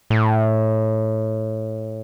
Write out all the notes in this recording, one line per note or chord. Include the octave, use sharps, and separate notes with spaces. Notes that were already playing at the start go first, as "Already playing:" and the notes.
A2